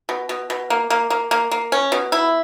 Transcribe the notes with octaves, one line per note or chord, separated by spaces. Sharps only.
B2
B2
B2
A#3
A#3
A#3
A#3
A#3
C#4
B2
E4